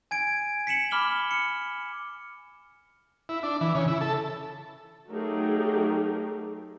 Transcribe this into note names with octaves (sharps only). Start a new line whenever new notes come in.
G#5 G#6 D7
B6 C#7 E7 F#7
B5 D6 F6 F#7 G7
C#7
E4
D4
E3
C#3
E4
A4
F#3 A3 D#4 G4 G#4 A#4